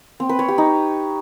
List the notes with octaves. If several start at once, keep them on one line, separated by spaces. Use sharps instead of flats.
C4
B4
C#5
G4
D#4